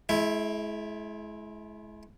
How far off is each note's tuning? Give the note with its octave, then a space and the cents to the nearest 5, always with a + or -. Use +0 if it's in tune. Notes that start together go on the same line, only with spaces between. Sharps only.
G#3 +40 E4 +0